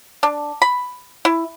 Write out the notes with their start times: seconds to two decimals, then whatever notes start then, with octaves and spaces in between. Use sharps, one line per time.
0.23 D4
0.62 B5
1.25 E4